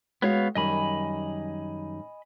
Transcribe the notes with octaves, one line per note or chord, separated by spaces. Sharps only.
G#3 B3 F#4 C#5 F5
F#2 D#3 G3 D#5 G#5 B5